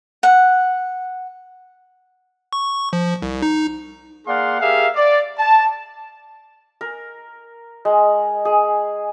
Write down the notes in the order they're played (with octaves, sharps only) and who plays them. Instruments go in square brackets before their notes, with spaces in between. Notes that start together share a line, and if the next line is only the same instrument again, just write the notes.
[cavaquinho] F#5
[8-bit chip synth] C#6
F3
C2
D#4
[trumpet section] A#3 G#4 D5 F5 F#5 C6
G4 G#4 A#4 E5 F5
D5
A5
[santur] A#4
G#3
G#4